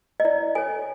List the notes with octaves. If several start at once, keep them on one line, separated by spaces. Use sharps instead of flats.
D#5
E4 D5
A4 C#5 G#5